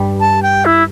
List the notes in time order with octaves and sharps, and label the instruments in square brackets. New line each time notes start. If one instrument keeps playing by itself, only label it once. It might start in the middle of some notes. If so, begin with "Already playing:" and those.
Already playing: [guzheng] G2 G3
[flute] A5
G5
E4